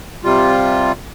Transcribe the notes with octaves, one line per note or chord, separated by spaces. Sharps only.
C3 G3 F4